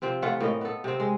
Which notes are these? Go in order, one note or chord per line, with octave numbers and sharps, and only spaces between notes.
C3 F3 C4
E3 A3 F4 F#5
A2 A#3 D#5
B3 A4
C3 C4
G#3